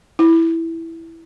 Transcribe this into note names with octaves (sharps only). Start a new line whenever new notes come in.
E4